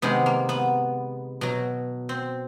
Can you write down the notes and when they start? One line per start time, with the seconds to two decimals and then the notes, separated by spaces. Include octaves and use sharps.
0.02 C3 D#3 G#3 B3
0.26 A#3
0.49 B3
1.41 B2 F#3
2.09 C4